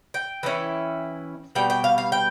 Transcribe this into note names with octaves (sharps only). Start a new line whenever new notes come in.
G5
E3 A3 C#4 E4
B2 G3 G5
G5
F5
F5
G5